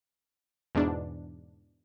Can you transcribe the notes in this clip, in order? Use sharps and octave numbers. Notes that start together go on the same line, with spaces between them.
E2 G#2 B2 D4